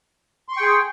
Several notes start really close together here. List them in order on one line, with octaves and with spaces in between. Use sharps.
C6 C#6 G5 G#4